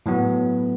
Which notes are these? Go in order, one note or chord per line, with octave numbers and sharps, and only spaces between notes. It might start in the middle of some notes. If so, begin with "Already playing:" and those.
A2 F#3 B3 F#4